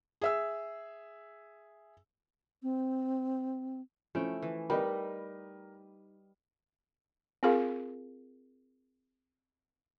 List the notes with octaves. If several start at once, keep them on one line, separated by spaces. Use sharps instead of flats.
G#4 E5 E6
C4
F3 A3 C#4 E4 G5
E3
G3 D#4 A#4 B4 D#5 B5
C4 F4 G#4 A#4 F5